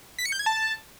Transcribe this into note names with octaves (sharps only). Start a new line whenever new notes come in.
B6
C#7
G6
G#6
A5